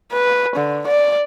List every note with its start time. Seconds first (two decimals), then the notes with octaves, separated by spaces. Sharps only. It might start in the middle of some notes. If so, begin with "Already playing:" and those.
0.12 B4
0.56 D3
0.87 D5